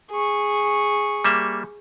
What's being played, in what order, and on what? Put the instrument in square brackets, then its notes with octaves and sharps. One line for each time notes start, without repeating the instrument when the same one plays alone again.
[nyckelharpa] G#4 C#6
[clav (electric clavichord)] G3 A#3 E5